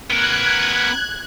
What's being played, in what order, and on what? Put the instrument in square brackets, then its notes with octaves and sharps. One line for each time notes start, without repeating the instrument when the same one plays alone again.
[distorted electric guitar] B3 A#4 [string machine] F#6 G#6